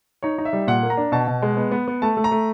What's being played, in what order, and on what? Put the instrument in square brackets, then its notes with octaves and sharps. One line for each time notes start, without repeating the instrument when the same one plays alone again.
[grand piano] D#4 C#5
D#4
E5
G3
A#2 F#5
A#3
A#5
D4
B2 A5
B2
G#3
B3
B3
B3
A3 A5
A3
A#5
A3